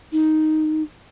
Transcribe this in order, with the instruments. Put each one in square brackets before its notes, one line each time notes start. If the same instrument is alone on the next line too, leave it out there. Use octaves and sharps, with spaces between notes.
[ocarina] D#4